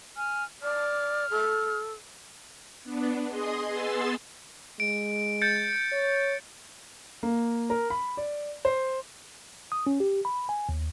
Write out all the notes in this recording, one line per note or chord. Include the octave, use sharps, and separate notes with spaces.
G#5 F6
D5 F6
A4
B3 D4
G#4 D#5 C6 D#6
B3 G#4 C6 E6 A6
G#3 D7
G6 A6 C#7
C#5
A#3
A#4
B5
D5
C5
D#6
C#4
G4
B5
G#5
D#2